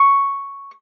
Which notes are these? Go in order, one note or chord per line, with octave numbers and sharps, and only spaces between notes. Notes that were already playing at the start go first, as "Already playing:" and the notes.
Already playing: C#6